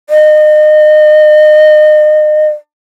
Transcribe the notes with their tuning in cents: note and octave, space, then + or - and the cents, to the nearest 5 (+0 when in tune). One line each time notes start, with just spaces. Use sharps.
D#5 -35